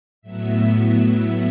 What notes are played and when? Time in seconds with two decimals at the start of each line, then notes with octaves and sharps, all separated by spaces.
0.22 A2 F#3 B3 E5
0.81 E5